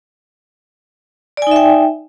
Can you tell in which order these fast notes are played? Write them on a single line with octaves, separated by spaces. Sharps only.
D5 G#5 D#4 E5 G5